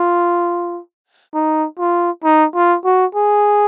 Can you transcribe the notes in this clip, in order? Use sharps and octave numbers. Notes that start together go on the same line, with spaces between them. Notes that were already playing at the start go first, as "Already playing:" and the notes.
Already playing: F4
D#4
F4
D#4
F4
F#4
G#4